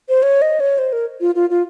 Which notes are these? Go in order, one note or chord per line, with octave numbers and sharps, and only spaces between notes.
C5
C#5
D#5
C#5
C5
A#4
F4
F4
F4